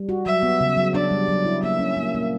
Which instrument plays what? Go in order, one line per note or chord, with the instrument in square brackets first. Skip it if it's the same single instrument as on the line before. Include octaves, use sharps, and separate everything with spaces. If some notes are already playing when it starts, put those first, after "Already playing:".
Already playing: [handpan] G3
F#4
[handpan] F#3 [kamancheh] E5
[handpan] B3
C#3
F#3
[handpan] D4 [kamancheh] D5
[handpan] G3
F#3
E4
[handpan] A#3 [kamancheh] E5
[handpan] C#4
A#3
A#3